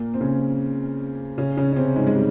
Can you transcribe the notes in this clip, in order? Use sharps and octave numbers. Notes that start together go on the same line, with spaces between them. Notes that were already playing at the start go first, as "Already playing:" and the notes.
Already playing: A#2 A#3
C4
C#3 C#4
C#3 C#4
C#3 C#4
C#4
C3 C4
G#2 G#3
G#3
G3